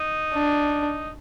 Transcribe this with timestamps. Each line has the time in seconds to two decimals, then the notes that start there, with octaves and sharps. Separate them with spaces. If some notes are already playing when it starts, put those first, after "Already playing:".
Already playing: D#4
0.33 D4